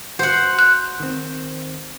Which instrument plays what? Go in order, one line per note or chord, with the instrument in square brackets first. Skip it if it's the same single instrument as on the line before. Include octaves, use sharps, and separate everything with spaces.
[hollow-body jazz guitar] F#4 [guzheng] C5 F#5
[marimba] F#6
[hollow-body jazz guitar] D#3 C4